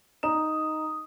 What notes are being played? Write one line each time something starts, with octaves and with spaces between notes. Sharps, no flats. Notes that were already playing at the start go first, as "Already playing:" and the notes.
D#4 A#5 D#6 E7